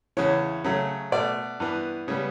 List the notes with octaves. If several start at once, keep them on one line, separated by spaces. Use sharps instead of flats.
E2 C#3 E3 C#5
C#3 F#3 A3
B2 A3 D5
G2 E3 B3
C#3 G3 B3 C#5